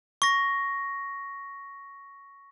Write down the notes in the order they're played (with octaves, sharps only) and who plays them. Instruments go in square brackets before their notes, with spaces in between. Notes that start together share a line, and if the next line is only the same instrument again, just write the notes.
[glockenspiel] C#6 A#6